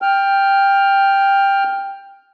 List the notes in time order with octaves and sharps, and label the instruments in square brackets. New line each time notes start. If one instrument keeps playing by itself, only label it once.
[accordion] G5 F6